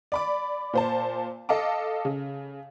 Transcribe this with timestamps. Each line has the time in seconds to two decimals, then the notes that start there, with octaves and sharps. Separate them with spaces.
0.12 D5 B5 D6
0.73 A#2 C5 A5
1.49 A4 D#5 F5 A5 D6
2.05 C#3